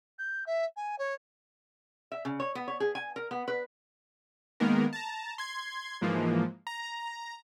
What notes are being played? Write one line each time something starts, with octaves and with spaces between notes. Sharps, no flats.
G6
E5
G#5
C#5
E5
C#3
C#5
B3
C#5
G#4
G#5
A#4
B3
B4
D#3 G#3 A#3 B3 A#4
A5 A#5
C6 G#6
G#2 E3 F3 G#3 A#3
A#5